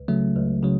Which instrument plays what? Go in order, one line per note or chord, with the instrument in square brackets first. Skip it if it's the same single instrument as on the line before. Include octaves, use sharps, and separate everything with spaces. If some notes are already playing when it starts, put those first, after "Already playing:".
Already playing: [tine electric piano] C#2
C#3 F#3 A3
C#2
C#3 F#3